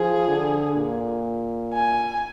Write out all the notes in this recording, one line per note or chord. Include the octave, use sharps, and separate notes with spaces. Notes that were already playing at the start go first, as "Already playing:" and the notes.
Already playing: F3 G#4
D3
A#2
G#5